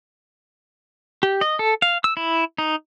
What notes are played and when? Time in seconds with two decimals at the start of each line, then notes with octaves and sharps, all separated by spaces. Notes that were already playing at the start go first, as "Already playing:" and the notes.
1.23 G4
1.41 D#5
1.59 A4
1.82 F5
2.04 E6
2.17 E4
2.58 D#4